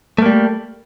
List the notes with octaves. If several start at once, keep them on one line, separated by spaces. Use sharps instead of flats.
G3 A3 A#3